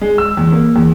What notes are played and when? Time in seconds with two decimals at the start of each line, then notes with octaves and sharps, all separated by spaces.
0.01 G#3
0.18 E6
0.37 E2
0.52 A#3
0.76 E2